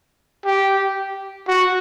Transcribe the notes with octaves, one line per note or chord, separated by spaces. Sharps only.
G4
F#4